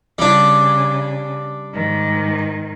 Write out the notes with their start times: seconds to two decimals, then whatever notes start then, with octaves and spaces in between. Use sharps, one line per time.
0.18 C#3 G3 D4
1.74 G#2 D#3